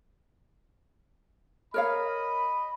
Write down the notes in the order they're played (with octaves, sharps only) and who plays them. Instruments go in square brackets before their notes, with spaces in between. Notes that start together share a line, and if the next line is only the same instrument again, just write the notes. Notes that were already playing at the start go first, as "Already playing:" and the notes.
[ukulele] A#4 C#5 F5 [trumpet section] D#5 B5